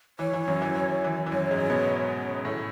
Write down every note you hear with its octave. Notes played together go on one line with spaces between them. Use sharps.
E3 C#5
E3
F#2 F#3
E3
E3
E3
E3
F#2 F#3 C#5
G#2 G#3
B2 B3
A2 A3 C#5